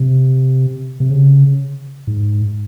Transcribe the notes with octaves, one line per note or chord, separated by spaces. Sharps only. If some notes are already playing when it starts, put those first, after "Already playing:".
Already playing: C3
C3
C#3
G#2